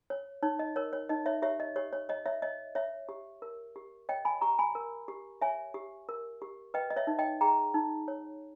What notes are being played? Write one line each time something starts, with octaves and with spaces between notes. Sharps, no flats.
C#5
D#4 C#5
D#5
A#4 C#5
C#5
D#4 D#5
C#5 E5
G4 C#5 E5
D#5
G4 C#5
C#5
C#5 D#5
C#5 E5
C#5 D#5
C#5 E5
G4
A#4
G4
C#5 D#5 G5
G#5 B5
G4 A#5 C#6
G#5 B5
A#4
G4
C#5 E5 G#5
G4
A#4
G4
B4 D#5 G5
D#5
C#5 E5
D#4
D#5 G5
G#4 G5 A#5
D#4
C#5